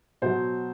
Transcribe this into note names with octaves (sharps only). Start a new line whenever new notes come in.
B2 F#3 C5